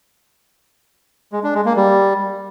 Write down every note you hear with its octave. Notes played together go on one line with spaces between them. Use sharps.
G#3
D4
G#3
A#3
G3